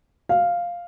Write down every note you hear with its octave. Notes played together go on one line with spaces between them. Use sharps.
F5